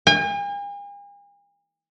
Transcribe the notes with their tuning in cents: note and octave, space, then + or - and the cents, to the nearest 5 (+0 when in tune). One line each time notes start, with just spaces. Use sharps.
G#5 -45